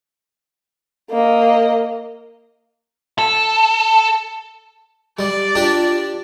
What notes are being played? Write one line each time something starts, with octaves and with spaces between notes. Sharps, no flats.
A#3 D#5
A4
G3 D5
D4 F4 G4